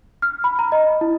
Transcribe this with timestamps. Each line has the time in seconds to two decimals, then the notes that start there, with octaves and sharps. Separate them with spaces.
0.22 F6
0.44 B5
0.59 A#5
0.72 D#5
1.01 E4